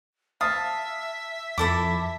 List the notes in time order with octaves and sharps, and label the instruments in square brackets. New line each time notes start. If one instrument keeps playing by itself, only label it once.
[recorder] E5 [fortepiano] F5 D#6 [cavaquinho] A5
[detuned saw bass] F2 [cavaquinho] E4 A4 B5 [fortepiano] D6